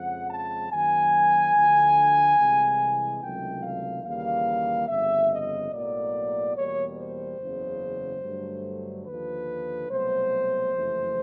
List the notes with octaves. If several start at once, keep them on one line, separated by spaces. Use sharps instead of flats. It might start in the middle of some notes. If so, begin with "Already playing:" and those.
Already playing: F2 C#3 F3 G#3 F#5
A5
F#2 D#3 F#3 A#3 G#5
D2 D3 F3 A3
C2 C3 E3 G#3
C#2 C3 D#3 F#3 A3 G5
F5
D#2 C#3 E3 G3 A#3 F5
G1 F2 C#3 E5
D#5
B1 A2 F#3 A#3 D5
E2 B2 G3 A#3 C#5
C5
F#1 E2 C#3
G2 D3 F#3 A3
D#2 D3 F3 B4
C2 B2 F#3 A3 C5
F#1 F2 C3 E3 A3